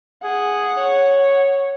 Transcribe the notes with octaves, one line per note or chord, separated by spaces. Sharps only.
G#4 F#5
C#5